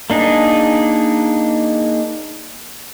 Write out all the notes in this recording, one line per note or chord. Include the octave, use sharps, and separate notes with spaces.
A#3 D4 D#4 G#4